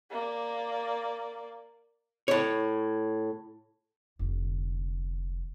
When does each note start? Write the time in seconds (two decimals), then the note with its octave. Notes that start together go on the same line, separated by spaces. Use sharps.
0.11 A#3 D5
2.28 A2 C#5
4.19 F1 D3